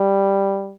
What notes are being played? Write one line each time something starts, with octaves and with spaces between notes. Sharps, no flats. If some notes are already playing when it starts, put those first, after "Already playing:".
Already playing: G3